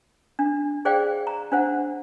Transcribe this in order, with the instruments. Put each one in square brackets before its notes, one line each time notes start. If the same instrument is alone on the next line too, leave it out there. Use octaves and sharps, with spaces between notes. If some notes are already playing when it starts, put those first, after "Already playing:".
[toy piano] D4
G#4 C5 D5 F5 G5
A#5
D4 C5 F#5